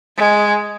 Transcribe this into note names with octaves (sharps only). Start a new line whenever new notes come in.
G#3